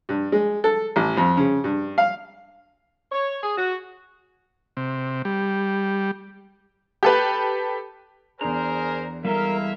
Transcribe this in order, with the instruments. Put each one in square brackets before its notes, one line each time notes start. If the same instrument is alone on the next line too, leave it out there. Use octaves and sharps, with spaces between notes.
[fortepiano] G2
G#3
A4
A1
F2
C#3
G2
F5
[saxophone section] C#5
G#4
F#4
[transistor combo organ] C3
G3
[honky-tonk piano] G4 A4 B4
[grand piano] E2 D4 [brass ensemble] G#4 A#4 C5 [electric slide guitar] A#5
[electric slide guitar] G3 G#3 A4 [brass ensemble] E4 E5 F5 [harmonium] A#4